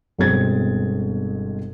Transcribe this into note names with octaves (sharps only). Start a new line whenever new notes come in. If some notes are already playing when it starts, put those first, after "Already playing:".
G1 B2 G#3 C4 G#6 A6